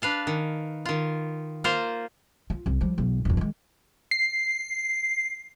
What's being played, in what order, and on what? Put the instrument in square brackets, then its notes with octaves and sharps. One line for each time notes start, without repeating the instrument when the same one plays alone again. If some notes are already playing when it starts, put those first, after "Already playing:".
[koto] D4 B4 F5 A5
D#3
D#3 F4
A#3 F4 A#4 C5 A#5
[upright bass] F4
C2
F3 G3
B1 E2
D1 F2
D#3 G#3
[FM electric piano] C7